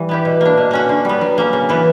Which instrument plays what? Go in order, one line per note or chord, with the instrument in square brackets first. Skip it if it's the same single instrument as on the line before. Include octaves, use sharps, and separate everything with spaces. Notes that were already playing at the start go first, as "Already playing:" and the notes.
Already playing: [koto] E3 G3
B3 E4 G4
B2
A#3 D4
B2
A#3 C#4 F#4
D3
G3 B3
F#3
A#3 C#4
C#3
E3 B3 E4